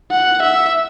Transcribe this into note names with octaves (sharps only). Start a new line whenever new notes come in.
F#5
E5